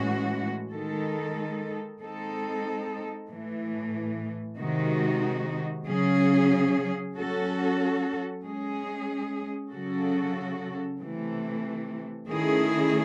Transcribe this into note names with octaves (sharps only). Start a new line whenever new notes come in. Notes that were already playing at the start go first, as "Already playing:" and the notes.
Already playing: A2 E3 G#3 C#4 F#4
D#3 G#3 D#4 A4
G#3 C4 D#4 A4
A2 E3 A3
C3 D#3 G#3 D#4 F#4
C#3 F#3 C#4 G#4
F#3 C#4 F#4 A4
G#3 C#4 G#4
C#3 F#3 C#4 F#4 A4
C3 E3 A3
D#3 A3 C#4 E4 G#4